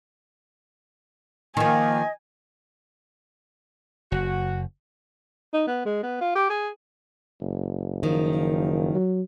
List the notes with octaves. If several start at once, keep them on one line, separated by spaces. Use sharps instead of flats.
D#3 F3 A#3 D#5 G#5
F#1 F#4
D#4
B3
G#3
B3
F4
G4
G#4
F#1
D#3 F3
F#3